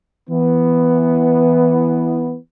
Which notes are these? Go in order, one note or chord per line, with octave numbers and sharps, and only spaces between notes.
E3 B3